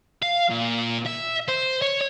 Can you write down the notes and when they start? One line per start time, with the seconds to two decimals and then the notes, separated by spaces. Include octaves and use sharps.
0.22 F5
0.50 A#2
1.06 E5
1.48 C5
1.82 C#5